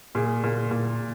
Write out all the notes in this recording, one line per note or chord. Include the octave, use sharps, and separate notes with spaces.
A#2 G#4
A#2
A#2